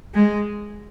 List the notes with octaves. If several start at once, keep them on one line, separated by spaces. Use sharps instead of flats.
G#3